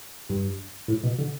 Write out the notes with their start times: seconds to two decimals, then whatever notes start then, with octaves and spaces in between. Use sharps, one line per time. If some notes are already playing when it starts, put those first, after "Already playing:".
0.29 G2
0.88 A2
1.03 B2
1.19 D3